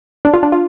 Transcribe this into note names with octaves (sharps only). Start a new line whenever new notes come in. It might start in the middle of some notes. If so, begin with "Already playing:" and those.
D4
F4
D4
F4